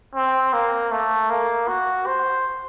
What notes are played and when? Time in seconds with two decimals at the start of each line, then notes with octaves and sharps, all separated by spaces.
0.16 C4
0.53 A#3
0.92 A3
1.30 A#3
1.68 F#4
2.06 C5